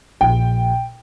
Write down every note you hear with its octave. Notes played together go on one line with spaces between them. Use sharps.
A#1 G5